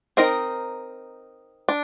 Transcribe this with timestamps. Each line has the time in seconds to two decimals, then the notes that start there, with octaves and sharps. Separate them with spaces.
0.17 C4 D#4 A#4 D#5
1.69 D4